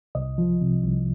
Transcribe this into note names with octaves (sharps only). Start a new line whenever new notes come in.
C2 D#5
F3
C3
C2